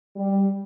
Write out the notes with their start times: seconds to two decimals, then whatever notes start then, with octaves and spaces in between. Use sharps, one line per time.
0.16 G3